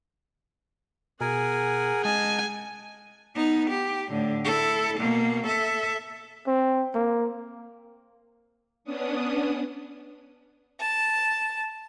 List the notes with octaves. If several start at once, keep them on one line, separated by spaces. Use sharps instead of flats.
B2 G#4 A#4 F#5 G#5
G#3 D#5 G#5 A5
B3 D#4
G4
A2 D3
E4 A4
B2 A#3
A4 E5
C4
A#3
B3 C#4 D4 D#6
A5